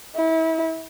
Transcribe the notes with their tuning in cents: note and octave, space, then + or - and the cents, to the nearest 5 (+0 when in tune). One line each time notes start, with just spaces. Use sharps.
E4 -30